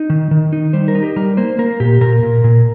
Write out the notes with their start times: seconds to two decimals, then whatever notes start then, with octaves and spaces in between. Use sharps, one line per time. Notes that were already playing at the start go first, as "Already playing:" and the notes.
Already playing: D#4
0.10 D#3
0.31 D#3
0.53 D#4
0.73 G3 C5
0.88 A#4
0.95 D#4
1.02 G4
1.16 G3 A#4
1.37 A#3 C5
1.59 A#3 A#4
1.80 A#2 G4
2.01 A#2 A#4
2.23 A#2
2.44 A#2